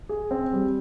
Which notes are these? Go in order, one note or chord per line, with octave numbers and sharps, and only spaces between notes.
G#4
C4
G3